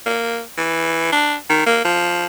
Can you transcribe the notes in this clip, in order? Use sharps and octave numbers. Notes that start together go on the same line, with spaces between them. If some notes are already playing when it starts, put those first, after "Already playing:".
A#3
E3
D4
D#3
A#3
F3